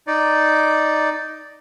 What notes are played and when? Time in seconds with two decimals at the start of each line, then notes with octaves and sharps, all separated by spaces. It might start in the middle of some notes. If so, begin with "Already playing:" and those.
0.07 D#4 D5